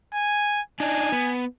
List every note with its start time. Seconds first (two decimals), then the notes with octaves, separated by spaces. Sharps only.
0.14 G#5
0.80 D4 D#4 G#5
1.12 B3